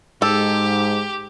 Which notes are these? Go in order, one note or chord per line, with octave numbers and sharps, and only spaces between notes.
G#2 G4 A4